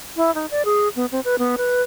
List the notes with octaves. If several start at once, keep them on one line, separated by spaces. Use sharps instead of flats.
E4
D#4
D5
G#4
B3
C4
B4
B3
B4